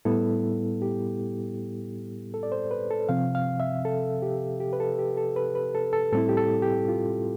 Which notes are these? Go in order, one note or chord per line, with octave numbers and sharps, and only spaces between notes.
A2 G3 B3 E4 A4
G4
A4
D5
C5
B4
A4
C3 F3 C4 F5
F5
E5
A4
G4
G4
B4
A4
G4
A4
B4
B4
A4
A4
A2 G3 C4 E4 A4
G4
A4
G4
F4